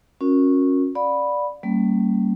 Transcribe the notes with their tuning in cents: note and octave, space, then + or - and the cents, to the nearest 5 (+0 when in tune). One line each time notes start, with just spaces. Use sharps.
C#4 -10 F#4 -35 A#4 +0
D5 +0 F5 +45 B5 -5
G3 -15 A#3 -30 C#4 -15